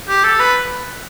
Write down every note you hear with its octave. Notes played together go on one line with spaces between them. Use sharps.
G4
A4
B4